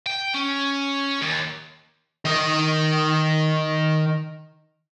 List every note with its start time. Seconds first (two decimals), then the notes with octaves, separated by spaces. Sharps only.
0.06 G5
0.34 C#4
1.22 D#2
2.25 D#3 D#5